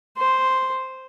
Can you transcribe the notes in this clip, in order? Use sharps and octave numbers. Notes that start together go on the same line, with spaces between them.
C5